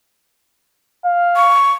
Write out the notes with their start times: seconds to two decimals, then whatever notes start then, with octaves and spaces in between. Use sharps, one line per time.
1.05 F5
1.36 C#6